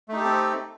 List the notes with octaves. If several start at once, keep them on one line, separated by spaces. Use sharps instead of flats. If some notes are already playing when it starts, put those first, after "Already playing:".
A3 C4 D#4 G4 A4